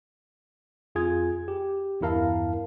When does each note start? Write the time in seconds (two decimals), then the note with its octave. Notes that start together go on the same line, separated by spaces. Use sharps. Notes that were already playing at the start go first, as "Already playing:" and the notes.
0.95 F2 F4 G#4 G#6
1.48 G4
2.01 E2 G2 E4 A#4 F5 A5